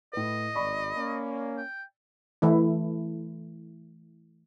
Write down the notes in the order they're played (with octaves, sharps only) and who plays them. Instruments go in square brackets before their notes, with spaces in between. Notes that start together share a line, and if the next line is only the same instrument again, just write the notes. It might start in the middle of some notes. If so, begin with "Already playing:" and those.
[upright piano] A2 B4 [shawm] D#5
[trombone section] G#1 [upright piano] D5 B5 C#6
[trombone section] A#3 C#4
[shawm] G5
[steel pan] E3 A3 E4